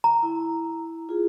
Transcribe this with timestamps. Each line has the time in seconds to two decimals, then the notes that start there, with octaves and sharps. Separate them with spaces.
0.04 A#5
0.23 E4
1.09 F4 G#4